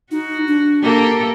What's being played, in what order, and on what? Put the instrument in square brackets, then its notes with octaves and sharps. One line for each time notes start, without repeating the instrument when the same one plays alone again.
[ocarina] D#4 [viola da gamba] F#4
[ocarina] D4
[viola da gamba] A#3 G4 A4